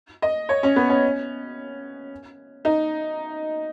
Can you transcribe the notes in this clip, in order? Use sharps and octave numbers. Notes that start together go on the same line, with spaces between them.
D#5
C#5
C#4
B3
C#4
D#4